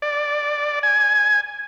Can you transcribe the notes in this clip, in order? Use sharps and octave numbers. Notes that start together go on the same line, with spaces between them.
D5
G#5